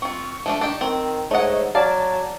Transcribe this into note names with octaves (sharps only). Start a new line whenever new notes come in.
C4 F4 C#6
F3 A3 D4
D4 D#4 G4
D#3 C4
G#2 A3 C#5 D#5 F#5
F#3 D5 F5 A5